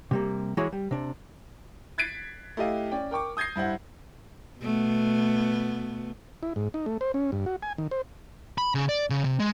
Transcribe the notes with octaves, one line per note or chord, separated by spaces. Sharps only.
C3 G3 A#3
E3 G#3 E4 F#4 G#4 C#5
G3
C3 D4
F#6 G#6 A6 B6 C7 D7
A3 E4 G4 D#5 F5
C#4 D5 G5
A#4 G5 C#6 D6
D#6 G6 G#6 A#6 C7
G2 E4 C5 F#5
B2 A3 B3
E4
G#2
D#4
A3
C5
C#4
G2
F#4
G#5
D#3
C5
B5
C#3
D5
C#3
C3
G#3